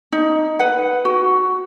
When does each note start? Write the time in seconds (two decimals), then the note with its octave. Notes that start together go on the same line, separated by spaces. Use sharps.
0.12 D#4
0.59 B4 F#5
1.05 F#4